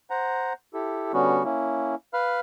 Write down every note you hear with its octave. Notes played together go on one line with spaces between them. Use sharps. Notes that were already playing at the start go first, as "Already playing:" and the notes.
C5 F#5 A#5
E4 G4 A4
D3 G3 B3 C#4 F#4
A#3 C#4 E4
B4 F5 B5 F6